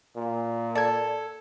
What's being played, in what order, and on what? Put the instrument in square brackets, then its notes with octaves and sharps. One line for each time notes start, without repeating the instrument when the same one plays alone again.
[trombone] A#2
[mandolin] A4 [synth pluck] D5 G#6